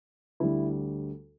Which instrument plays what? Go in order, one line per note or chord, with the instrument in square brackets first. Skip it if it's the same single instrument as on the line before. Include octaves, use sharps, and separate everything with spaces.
[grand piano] D2 D3 G3 E4